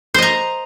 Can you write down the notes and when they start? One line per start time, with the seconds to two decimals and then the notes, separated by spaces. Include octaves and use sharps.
0.14 C5
0.18 D#5
0.22 A#5